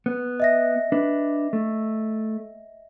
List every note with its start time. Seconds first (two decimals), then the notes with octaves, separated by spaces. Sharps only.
0.06 B3
0.40 D#5 E5 A#6
0.92 D4 B4
1.53 A3